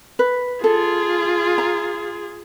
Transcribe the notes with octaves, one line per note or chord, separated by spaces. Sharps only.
B4
F4 G#4 A4
A#5